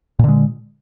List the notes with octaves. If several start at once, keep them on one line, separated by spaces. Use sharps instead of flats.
A#2 D3 G#3